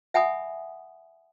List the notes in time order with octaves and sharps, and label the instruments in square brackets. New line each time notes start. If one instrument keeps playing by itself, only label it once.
[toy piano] E5 F#5 G#5 B5 D#6